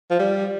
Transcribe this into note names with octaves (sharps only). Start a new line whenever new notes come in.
F3
G3